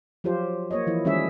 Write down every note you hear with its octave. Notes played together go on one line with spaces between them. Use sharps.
F3 F#3 F4 G4 C5
A#3 C#5 D#5
E3 F3 E4
D#3 G3 A3 C#4 G#4 E5